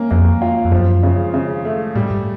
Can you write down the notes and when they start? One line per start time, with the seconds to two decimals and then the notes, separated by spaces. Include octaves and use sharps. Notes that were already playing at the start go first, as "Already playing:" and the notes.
Already playing: A#3 C#4
0.11 F2 A#3
0.42 F4
0.65 F2
0.72 F#2 F3
1.03 C#3
1.34 C#3
1.65 A3
1.95 A2 G3
2.11 G#2